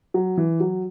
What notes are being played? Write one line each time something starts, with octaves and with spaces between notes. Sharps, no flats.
F#3
E3
F#3